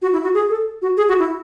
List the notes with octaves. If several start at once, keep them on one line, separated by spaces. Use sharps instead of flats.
F#4
E4
F#4
G#4
A4
F#4
G#4
F#4
E4